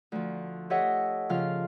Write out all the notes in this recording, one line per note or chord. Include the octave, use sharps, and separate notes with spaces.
D2 F3
G4 A4 C#5 D#5 E5 F#5
C#3 F3 F4 F5 F6